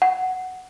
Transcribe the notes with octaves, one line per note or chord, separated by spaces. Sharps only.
F#5